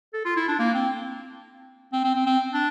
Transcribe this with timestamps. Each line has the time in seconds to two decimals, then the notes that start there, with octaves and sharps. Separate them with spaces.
0.14 A4
0.25 F4
0.37 E4
0.48 D4
0.59 A#3
0.74 C4
1.93 C4
2.04 C4
2.15 C4
2.27 C4
2.54 D4